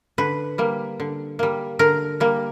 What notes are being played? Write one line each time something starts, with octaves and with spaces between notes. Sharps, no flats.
D3 B4
G3 A#3
D3
G3 A#3
D3 A#4
G3 A#3